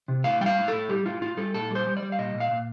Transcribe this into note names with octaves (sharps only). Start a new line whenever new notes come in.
C3
A2 F5
G3 G5
F5
A2
A2 A4
G3 G4
A2 F4
A2 F4
G3 A4
A#2 A4
G3
C5
G3
D5
G3
F5
A#2 D#5
A#2
F5
A#2